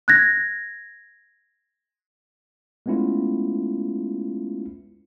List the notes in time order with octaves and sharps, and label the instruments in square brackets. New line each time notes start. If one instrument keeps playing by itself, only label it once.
[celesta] F#6 G#6 A#6
[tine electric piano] G#3 A3 B3 C#4 E4 F4